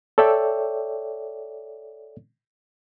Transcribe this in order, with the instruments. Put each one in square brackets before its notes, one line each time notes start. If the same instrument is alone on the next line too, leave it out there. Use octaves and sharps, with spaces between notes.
[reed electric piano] A4 C#5 D5 E5 G5